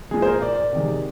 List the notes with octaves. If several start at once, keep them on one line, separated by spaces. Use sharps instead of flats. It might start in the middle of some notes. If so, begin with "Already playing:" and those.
A#2 G#3 G#4
C5
A#4
D5
C3 D#3 G#3